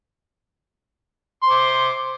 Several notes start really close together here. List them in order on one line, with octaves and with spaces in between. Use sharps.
C6 C5 D6